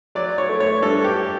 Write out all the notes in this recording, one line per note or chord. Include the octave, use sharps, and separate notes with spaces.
F#3 D5
C#5
A3
C#5
G2 A4
G4